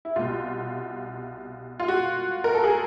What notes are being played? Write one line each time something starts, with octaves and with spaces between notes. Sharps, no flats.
E4
C2 B2 F4
F4
F#4
A#4
A4
G#4